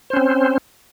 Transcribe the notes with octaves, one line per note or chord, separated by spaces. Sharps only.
C4 C#4 C5